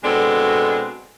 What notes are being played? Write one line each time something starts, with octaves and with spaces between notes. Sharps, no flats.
B2 G#3 C4 D4 F#4 A4